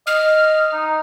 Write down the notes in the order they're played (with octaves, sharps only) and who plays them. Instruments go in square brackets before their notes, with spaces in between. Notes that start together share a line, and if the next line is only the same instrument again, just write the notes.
[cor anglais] D#5 [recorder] F6
[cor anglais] D#4